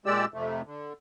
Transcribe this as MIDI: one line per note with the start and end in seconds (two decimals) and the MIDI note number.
0.06 0.25 46
0.06 0.25 56
0.06 0.25 67
0.06 0.25 74
0.06 0.25 88
0.34 0.62 41
0.34 0.62 48
0.34 0.62 57
0.66 0.93 50